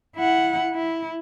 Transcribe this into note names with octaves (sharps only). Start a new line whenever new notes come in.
E4 F#5
E4